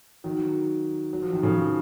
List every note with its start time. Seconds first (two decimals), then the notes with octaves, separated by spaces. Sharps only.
0.24 D#3 F#3
1.13 F#3
1.22 F3
1.33 D#3
1.42 C#3 F3